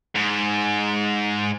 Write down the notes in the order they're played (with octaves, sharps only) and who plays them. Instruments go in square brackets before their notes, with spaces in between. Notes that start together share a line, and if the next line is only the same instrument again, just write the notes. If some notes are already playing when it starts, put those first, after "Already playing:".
[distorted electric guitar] G#2